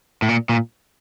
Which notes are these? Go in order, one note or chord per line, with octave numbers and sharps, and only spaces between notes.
A2
A#2
A#2